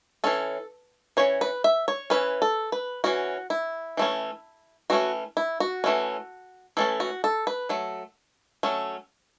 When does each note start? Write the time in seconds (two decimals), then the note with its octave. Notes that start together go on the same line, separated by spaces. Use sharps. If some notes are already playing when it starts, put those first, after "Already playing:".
0.24 E3 C#4 A4
1.17 E3 C#4 C#5
1.41 B4
1.64 E5
1.88 C#5
2.10 E3 C#4 B4
2.42 A4
2.72 B4
3.04 E3 C#4 F#4
3.50 E4
3.97 E3 A3 C#4
4.90 E3 A3 C#4 F#4
5.37 E4
5.60 F#4
5.84 E3 A3 C#4
6.77 E3 A3 C#4 A4
7.00 F#4
7.24 A4
7.47 B4
7.69 F#3 A3
8.63 F#3 A3 C#4